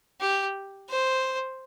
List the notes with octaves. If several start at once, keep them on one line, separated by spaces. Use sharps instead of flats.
G4
C5